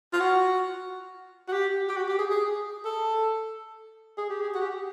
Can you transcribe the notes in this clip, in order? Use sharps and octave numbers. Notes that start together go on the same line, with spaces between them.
F4
F#4
F#4
G4
G4
F#4
G4
G#4
G#4
A4
G#4
G4
G#4
F#4
G4